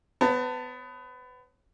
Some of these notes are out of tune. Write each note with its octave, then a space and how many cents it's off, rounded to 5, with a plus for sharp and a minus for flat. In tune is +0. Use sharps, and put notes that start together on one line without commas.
B3 +25 C#5 -25 A5 +30